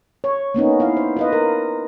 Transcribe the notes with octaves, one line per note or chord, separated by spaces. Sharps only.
C#5
A#3 B3 C#4 D#4
E4 F5
C5
F4 B4 D#5
A#4